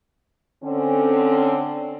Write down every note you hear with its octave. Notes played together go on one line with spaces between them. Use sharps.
D3 C4 C#4